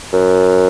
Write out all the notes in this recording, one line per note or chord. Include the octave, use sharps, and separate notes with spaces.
F#2